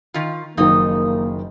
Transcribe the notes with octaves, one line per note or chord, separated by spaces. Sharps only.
D#3 F4
F#1 D#3 F3 A#3 D#4